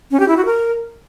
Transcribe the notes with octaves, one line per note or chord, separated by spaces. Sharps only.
C#4
G4
E4
F#4
A#4